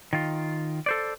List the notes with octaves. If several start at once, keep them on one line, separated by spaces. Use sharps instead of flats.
D#3 F4
A4 C5 D5